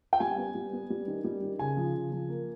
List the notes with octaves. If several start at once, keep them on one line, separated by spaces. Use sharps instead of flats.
G5
G3 G#5
B3
G3
B3
G3
D#3
G3
D#3
C#3 G#5
F3
C#3
F3
A#3